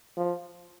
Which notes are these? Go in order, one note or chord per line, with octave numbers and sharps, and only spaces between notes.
F3